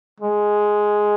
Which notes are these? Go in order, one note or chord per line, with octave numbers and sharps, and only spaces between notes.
G#3